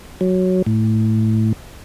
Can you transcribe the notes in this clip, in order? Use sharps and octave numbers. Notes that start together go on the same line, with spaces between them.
F#3
A2